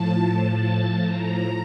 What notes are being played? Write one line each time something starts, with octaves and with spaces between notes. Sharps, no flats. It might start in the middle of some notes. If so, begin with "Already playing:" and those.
Already playing: A2 F3 A5
A5
A#5